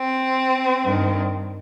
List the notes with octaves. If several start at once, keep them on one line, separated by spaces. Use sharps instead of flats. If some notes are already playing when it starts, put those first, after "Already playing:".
Already playing: C4
G2 D#3